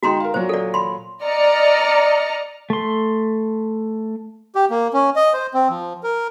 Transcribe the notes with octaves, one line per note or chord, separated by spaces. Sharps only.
G#3 D#4 F#4 G5 A#5 C6
A#4 F5
A#2 F#3 C5
A4 D5
B5 C6
D5 D#5 A#5 F6 C#7
A3 C6
G4
A#3
C#4
D#5
C5
C4
F3
A#4